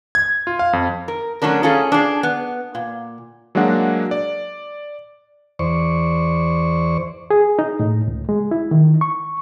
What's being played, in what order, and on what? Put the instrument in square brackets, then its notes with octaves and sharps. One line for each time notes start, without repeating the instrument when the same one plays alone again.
[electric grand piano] G#6
F4
F5
F2
[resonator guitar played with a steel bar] A#4
F#3 A3 C#4 D4 A#4
C#4 F4 G#4 A4
D4 G#4
B3
A#2
[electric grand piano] F#3 G#3 A#3 D4 F#5
D5
[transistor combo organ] E2 C5 D5 C#6
[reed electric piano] G#4
D#4
A2
C#2
G#3
E4
D#3
C#6